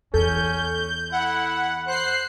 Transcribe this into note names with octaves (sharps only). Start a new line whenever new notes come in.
E2 C#4 A4 G6
E4 F#5
C5 F#6 C7